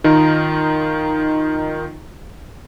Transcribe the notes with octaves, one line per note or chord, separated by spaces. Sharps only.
D#3 D#4 F4 A#4